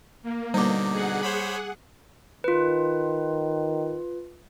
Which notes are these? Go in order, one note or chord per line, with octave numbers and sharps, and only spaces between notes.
A#3
B2 D3 G3 D#4 D6
G#4 F#5
C5 C#5 B5
D#3 F4 B4